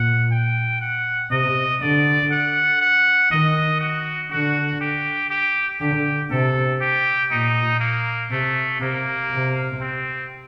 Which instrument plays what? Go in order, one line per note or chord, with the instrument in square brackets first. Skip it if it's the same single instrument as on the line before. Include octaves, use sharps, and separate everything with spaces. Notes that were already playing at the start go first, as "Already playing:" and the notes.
Already playing: [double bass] A#2 [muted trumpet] F#5
[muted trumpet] G5
F#5
[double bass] C3 [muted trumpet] D#5
[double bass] D3 [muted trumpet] D5
[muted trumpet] F#5
F#5
[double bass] D#3 [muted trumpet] D#5
[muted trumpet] F#4
[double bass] D3 [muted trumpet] F#4
[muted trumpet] G4
G4
[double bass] D3 [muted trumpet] G4
[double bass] C3 [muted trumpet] A4
[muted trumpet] G4
[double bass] A#2 [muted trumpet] D#4
[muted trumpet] A#3
[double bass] C3 [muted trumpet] A3
[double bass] C3 [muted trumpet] A#3
[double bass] C3
[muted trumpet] C4